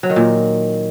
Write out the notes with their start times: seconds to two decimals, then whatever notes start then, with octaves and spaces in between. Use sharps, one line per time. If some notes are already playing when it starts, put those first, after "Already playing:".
0.03 F#3
0.10 D#3
0.16 A#2